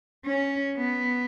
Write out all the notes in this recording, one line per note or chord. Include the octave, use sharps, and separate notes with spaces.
C#4
B3